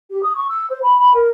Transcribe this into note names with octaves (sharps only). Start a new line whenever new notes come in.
G4
D#6
C#6
E6
C5
B5
B5
A#4